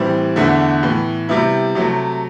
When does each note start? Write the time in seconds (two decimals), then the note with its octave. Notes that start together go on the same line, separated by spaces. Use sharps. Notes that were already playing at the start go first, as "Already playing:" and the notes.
Already playing: A2 E3 G3 C4
0.36 E2 D3 A3 E4
0.83 A2 E3 B3
1.29 C3 G3 B3 E4
1.75 C3 F#3 A3